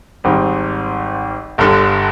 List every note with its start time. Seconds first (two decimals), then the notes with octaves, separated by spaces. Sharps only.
0.24 G#1 G#2 G3 C4
1.58 G1 G2 D3